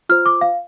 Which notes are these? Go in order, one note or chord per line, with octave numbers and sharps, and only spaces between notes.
F4 C5 F6
D6
F5